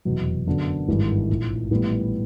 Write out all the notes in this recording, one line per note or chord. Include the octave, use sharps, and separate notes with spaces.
F1 E2 B2 F#3
F#2 D3 F#3 B3
G#1 G2 E3 G#3
A#1 A2 F3 A3
A#1 A2 E3 G3 B3